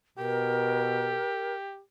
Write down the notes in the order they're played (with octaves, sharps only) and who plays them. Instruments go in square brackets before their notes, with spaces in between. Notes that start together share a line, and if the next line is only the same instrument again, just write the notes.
[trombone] B2 [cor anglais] G4 [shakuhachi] A#4